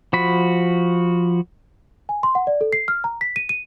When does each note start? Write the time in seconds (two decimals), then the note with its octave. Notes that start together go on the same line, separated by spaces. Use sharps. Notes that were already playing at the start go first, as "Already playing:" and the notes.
0.13 F3 F#4 B5
2.09 G#5
2.23 C6
2.35 F#5
2.47 D5
2.61 A4
2.73 C7
2.88 F6
3.04 A#5
3.21 B6
3.36 D#7
3.49 D#7